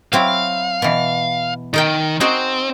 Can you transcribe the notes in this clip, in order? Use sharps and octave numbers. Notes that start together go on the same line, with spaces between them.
F#3 C4 E4 F5
B2 E3
D#3 D#4 A#4 G5
C4 D#4 F#4 G#4